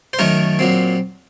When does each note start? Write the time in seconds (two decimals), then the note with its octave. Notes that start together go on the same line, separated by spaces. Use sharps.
0.13 C5
0.19 F#2 D#3 A3 A#4 C#5
0.59 A#2 F#3 C4